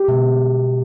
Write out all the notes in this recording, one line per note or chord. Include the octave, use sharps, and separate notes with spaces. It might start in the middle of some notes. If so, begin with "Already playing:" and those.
Already playing: G4
B2 G#3